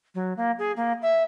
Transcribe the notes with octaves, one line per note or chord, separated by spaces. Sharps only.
F#3
A#3
G#4
A#3
E5